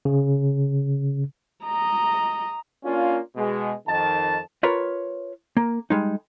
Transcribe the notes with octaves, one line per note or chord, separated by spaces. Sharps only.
C#3
D#5 A#5
A#3 C#4 D4 F4
B2 G#3
F2 D#3 A5
F4 A#4 B4 C#5
A#3
G3 G#3 D#4